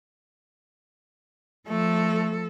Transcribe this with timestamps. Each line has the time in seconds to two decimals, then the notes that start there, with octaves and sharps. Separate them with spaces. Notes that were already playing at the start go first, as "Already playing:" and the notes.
1.68 F3 A3 A4